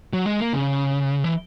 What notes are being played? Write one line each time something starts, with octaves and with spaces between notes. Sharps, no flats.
F#3
G#3
A#3
C#3
E3